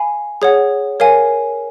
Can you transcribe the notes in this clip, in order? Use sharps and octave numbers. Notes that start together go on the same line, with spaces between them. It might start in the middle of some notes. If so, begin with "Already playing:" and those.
Already playing: F5 G#5 B5
G#4 C#5 F#5
A#4 C#5 F5 G#5